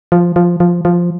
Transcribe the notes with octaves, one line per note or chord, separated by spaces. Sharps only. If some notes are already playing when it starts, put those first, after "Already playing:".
F3
F3
F3
F3